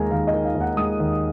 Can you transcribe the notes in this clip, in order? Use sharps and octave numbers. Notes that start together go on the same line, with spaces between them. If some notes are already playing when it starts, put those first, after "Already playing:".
Already playing: D#2 D#3 G#3 G#5 A#5
D#2 F5
D#5
D#3
F5
D#2
F#5
G#3 D#6
D#2